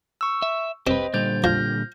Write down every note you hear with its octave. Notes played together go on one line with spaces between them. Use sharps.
C#6 E6
E5
C4 G4 B4 C5 D#5
A#2 D3 G3 C5 G6 A6
F3 F6 G6 A#6